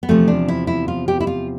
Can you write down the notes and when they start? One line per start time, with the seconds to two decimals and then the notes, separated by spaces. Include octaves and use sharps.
0.03 B3
0.09 E2 C3 F3 A3
0.28 D4
0.48 E4
0.67 E4
0.88 F4
1.08 G4
1.20 E4
1.27 F4